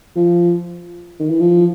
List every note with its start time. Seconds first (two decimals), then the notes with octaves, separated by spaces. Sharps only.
0.16 F3
1.20 D#3
1.30 E3
1.40 F3